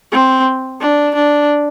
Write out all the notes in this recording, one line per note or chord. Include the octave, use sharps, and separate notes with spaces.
C4
D4
D4